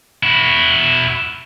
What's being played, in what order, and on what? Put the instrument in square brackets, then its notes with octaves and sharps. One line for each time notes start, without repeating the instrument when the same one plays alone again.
[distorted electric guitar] E4 F#4